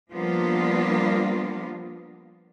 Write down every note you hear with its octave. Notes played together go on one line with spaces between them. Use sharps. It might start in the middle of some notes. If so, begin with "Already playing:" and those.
F3 G3 A#3 B3 D4 F4